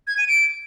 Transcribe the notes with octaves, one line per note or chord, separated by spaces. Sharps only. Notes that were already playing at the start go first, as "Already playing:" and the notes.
G#6
D#7
D7